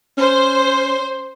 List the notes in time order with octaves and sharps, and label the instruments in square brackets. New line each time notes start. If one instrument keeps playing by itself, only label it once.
[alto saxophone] C#4 [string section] C5